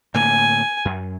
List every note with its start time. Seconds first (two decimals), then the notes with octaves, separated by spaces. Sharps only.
0.14 A2 D3 A#3 G#5
0.85 F#2